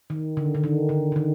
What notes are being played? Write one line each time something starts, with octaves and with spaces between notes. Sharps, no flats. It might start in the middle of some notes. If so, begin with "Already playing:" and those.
D#3
D3
D3
D#3
D3
D3
D#3